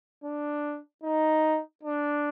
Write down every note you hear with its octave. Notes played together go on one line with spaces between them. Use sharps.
D4
D#4
D4